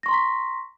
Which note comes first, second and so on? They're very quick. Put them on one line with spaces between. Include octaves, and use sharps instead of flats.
A#6 C#6 C6 A#5 B6